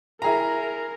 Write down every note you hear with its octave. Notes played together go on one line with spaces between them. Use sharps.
E4 G#4 A#4 A#5